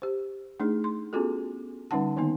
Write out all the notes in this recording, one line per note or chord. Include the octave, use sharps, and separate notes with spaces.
G4 C5
A3 D4 D#4 G#4
C6
B3 C#4 F4 F#4 G#4 A4
D3 G3 C#4 D#4 F#5 A5
D#3 A#3 B3 D#4